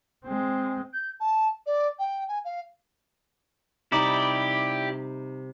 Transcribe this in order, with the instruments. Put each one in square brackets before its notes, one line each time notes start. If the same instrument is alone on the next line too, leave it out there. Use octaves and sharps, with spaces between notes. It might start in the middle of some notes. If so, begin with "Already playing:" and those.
[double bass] G#3 C4
[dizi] G6
A5
D5
G5
G#5
F5
[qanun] C3 G3 D#4 [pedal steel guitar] E4 D5 [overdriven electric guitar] G4